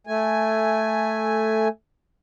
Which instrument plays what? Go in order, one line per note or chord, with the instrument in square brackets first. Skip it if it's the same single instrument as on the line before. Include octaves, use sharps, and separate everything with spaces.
[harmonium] A3 G#5